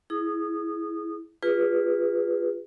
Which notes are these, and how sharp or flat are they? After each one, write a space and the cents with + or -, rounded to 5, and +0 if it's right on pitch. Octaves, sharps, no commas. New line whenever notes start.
E4 +0 G#4 +15 D#6 -20
F4 +0 G#4 -30 B4 +0